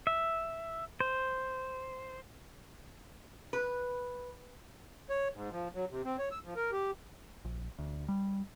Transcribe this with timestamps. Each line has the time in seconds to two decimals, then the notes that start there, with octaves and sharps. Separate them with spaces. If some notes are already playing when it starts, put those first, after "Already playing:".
0.07 E5
1.00 C5
3.53 B4
5.10 C#5
5.34 G#2
5.51 F3
5.74 F#3
5.91 C3
6.05 C4
6.19 C#5
6.31 E6
6.44 F3
6.56 A#4
6.72 G4
7.45 A#1
7.78 D2
8.08 G3